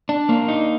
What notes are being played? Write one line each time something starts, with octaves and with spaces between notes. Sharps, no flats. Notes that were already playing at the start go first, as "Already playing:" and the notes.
D4
A#3
D#4